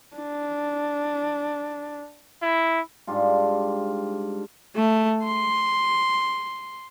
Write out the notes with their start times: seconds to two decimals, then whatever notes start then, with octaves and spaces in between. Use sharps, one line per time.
0.17 D4
2.42 E4
3.07 G#2 G3 D4 F4
4.76 A3
5.24 C6